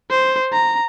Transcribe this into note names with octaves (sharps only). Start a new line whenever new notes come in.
C5
A#5